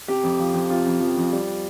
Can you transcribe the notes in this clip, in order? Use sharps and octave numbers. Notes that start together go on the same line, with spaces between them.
C3 G4
F2
F3
F2
C3 F4
F2
F3
F2
G3